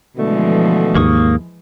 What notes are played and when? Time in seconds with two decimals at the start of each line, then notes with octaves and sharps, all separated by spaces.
0.17 B2 D3 E3 F3 G#3 A3
0.95 D#2 G#2 A#3 C#6 D#6